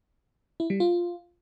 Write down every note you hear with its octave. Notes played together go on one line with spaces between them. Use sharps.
E4
G3
F4